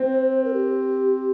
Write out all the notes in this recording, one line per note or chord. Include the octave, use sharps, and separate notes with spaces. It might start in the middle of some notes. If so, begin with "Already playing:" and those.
Already playing: C4 C5
A#4
G4